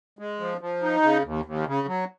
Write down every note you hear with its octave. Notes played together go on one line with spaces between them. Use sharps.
G#3
F3
F3
D#4
C#3
D#2
D#2
C#3
F#3